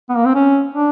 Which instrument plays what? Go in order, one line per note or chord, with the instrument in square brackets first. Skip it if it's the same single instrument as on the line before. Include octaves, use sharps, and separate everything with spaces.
[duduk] B3
A#3
C4
C#4
D4